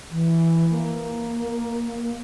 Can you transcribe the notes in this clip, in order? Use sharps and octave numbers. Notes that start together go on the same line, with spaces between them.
E3
A#3